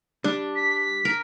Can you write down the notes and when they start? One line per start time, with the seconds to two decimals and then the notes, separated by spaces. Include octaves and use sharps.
0.24 G3 D4
0.56 B6
1.05 A#4